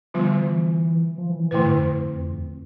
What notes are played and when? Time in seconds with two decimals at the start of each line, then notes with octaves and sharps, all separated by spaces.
0.14 D3 F3 G3 B3 F4
0.37 E3
1.18 F3
1.29 E3
1.40 E3
1.51 A2 D3 A3 E4 B4
1.62 G2
1.74 F2
2.20 F2
2.31 F2